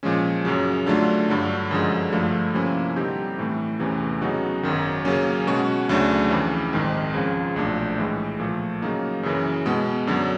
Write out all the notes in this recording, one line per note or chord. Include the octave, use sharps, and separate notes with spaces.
A#2 F3 G#3 C#4
F#2 C#3 F#3
D3 F#3 A3 D4 F4
G2 D3 F#3
F#2 D3 F3 G#3
G2 D3 F3 A3
C3 F3 A#3 C#4 E4
D3 G3 C4 D#4 G4
A2 E3 A3
E2 C3 E3 A3 C#4
C#3 F#3 B3 D#4 F#4
G#1 F#2 D#3
C#3 F#3 A#3 C#4
B2 G#3 C#4 F#4
D2 C#3 F#3 A3 D4
F2 C#3 E3
A#1 G#2 D#3 G#3 C4
C#2 C#3 F3
B1 A#2 F3 A3 D4
A2 E3 G#3
A#2 F3 A3
C#3 F#3 A#3 D#4
F#2 C#3 E3
B2 G#3 B3
F#2 D3 F#3